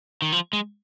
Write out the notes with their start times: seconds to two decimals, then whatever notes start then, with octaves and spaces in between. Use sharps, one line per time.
0.22 D#3
0.32 F3
0.53 G#3